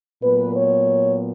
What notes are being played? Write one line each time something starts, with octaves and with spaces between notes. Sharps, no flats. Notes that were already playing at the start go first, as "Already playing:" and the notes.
A#2 F#3 B3 B4
C#5